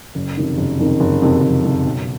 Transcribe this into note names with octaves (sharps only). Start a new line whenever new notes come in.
F#1
F2 C3 D#3
F#1
F2 C3 D#3
F#1
F2 C3 D#3
F#1
F2 C3 D#3
B1